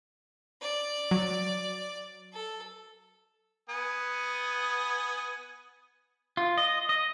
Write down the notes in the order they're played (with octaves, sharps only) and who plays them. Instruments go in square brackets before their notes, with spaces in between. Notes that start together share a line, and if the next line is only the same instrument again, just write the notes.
[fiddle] D5
[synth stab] F#3
[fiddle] A4
[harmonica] B3 G#5 D#6
[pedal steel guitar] F4
D#5
D#5